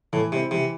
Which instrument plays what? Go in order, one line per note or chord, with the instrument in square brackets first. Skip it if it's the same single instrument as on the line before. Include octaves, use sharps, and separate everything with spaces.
[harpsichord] A2 [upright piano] E3
[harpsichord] C3 [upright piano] E4
[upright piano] C4
[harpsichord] C3 [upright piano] E3